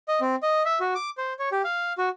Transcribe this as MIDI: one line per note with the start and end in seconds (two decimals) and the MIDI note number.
0.08 0.20 75
0.21 0.36 60
0.43 0.63 75
0.65 0.79 76
0.80 0.94 66
0.95 1.10 86
1.18 1.33 72
1.39 1.49 73
1.52 1.62 67
1.64 1.93 77
1.98 2.09 66